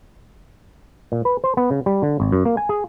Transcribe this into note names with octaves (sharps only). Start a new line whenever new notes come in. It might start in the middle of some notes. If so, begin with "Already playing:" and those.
A#2
B4
C5
B3
C#3
G3
D3
G#1
F#2
A#3
G#5
G#4